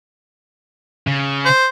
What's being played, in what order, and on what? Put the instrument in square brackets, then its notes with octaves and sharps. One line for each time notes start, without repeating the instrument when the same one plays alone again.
[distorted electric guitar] C#3
[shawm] C5